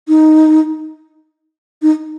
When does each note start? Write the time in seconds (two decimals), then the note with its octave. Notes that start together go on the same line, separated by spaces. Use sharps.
0.08 D#4
1.82 D#4